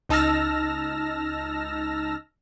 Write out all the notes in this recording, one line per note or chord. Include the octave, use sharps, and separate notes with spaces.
C#2 D#4 A5 E6 F6 A#6